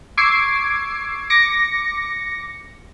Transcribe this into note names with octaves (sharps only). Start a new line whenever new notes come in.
C#6 D6 E6 G#6 C7 D7
D6 A#6 C#7